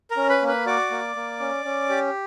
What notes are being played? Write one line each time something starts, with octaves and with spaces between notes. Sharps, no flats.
A#4 A#5
C#4
B4 B5
A#3
B4 B5
F#4 D5 D6
A#3
A#3
C#4
C#4
G4